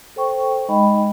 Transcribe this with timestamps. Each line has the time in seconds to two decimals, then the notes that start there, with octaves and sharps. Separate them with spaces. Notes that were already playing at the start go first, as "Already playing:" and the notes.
0.16 A4 C5 G5 C#6
0.69 G#3 D#4 D#5 G5 B5